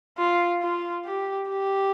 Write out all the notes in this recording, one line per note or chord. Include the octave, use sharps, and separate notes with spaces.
F4
F4
G4
G4